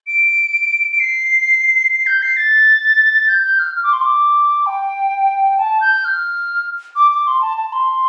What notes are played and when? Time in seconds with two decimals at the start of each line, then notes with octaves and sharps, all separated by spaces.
0.07 D7
0.91 D7
1.00 C7
1.92 C7
2.06 G6
2.22 C7
2.37 A6
3.28 G6
3.43 G6
3.59 F6
3.75 F6
3.83 D6
3.93 C6
4.01 D6
4.66 G5
5.59 A5
5.81 G6
6.04 F6
6.96 D6
7.11 D6
7.27 C6
7.41 A5
7.57 A5
7.72 C6